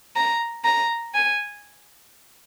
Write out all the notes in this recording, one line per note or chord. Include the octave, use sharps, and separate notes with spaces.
A#5
A#5
G#5